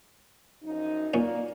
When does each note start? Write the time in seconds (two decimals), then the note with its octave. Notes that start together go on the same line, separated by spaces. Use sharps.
0.63 F#2 F3 D#4
1.14 A#2 A#3 C#4 D5